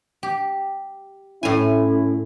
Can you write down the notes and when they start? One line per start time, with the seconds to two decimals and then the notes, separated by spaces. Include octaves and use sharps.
0.23 G4
1.43 A2 C#4 E4 G#5